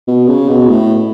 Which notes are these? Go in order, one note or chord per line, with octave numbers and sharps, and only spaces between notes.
B2
C#3
B2
A2